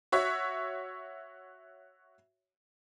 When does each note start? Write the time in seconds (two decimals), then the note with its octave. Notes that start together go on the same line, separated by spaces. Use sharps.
0.12 F#4 C#5 E5